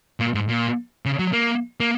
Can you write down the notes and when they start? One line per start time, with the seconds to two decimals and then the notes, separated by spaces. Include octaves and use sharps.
0.20 A#2
0.34 G#2
0.49 A#2
1.06 C#3
1.19 F#3
1.33 A#3
1.80 A#3